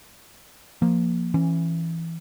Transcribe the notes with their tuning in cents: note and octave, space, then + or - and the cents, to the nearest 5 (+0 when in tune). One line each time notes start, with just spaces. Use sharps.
F3 +0 A#3 +0
E3 +5 C#4 -20